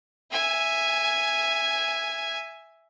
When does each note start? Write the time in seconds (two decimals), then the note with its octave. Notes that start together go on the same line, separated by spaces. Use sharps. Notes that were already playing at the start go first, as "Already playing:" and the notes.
0.32 E5 G#5